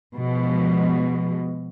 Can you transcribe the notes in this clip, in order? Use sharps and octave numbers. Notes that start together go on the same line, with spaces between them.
B2 F3 G#3